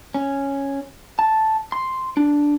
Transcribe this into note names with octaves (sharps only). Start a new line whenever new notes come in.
C#4
A5
C6
D4